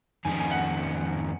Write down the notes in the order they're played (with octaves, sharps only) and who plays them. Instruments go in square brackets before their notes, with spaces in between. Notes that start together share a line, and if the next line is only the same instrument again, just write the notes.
[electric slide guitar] F2 D#3 A#3 C#4 G#4 [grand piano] G#5
[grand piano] G#5
F#5